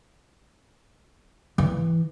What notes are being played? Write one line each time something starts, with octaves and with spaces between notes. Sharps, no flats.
E3